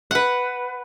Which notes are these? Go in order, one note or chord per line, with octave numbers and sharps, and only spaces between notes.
B4 F#5